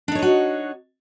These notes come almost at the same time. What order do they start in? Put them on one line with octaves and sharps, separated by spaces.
D4 D#4 C#5 D#5 F#4